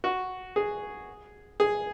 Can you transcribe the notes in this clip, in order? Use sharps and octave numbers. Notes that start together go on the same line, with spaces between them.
F#4
G#4
G#4